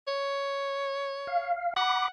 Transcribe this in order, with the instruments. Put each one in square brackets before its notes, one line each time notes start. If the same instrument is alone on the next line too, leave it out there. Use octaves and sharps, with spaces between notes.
[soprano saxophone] C#5
[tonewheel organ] F5
[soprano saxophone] F#5 [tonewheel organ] B5 D6